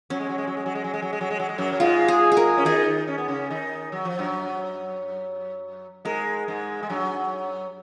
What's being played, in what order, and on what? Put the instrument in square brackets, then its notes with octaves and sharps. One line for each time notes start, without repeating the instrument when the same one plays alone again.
[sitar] F#3 [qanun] C#4
[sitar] G#3
F#3
G#3
F#3
G#3
F#3
G#3
F#3
G#3
F#3
G#3
F#3
G#3
F#3
G#3
F#2 F#3
F#3
[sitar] G#2 G#3 [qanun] F4
[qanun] G#4
G#4
A#4
[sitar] C#4
[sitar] D#3 D#4 [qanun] G#4
[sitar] C#4
B3
C#3 C#4
D#3 D#4
F#3
F3
F#2 F#3
[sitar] G#2 G#3 [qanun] A#4
[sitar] G#2 G#3
G#3
F#2 F#3